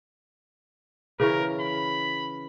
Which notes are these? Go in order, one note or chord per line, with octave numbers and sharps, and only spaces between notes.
C#3 E3 A#4 C#5
B5